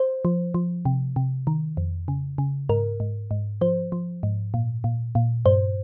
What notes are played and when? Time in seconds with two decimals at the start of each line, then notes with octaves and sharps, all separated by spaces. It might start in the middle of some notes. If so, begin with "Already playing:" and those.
Already playing: C5
0.25 F3
0.54 F3
0.85 C3
1.16 C3
1.47 D#3
1.77 F2
2.08 C#3
2.38 C#3
2.69 G#2 A#4
3.00 G#2
3.31 G#2
3.61 F3 C5
3.92 F3
4.23 G#2
4.54 A#2
4.84 A#2
5.15 A#2
5.46 G2 C5